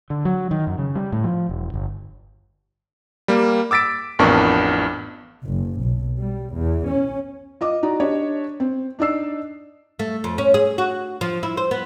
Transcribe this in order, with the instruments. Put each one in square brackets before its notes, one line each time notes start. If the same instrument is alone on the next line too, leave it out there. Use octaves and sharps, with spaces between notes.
[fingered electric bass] D3
F#3
D#3
F#2
C#3
G3
A2
F3
E1
G1
[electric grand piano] G3 A#3
D6 E6 A6 B6 D7
A1 F2 B3 D4 A#4 C#6
[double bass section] F#1
B1
G3
E2
C#4
[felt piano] F4 D#5 D6
D#4 F#4 D5 A#5
D4 G4 C#5 D#5
C4
D4 D#4 D5 E6 C7
[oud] A3
F2
C#4
G#4
F#4
F3
E4
C5
B3